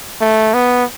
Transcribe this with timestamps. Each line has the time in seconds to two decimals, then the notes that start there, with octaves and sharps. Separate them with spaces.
0.21 A3
0.54 B3